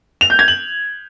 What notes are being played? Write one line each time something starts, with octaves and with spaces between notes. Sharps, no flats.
F7
G6
G#6
F#7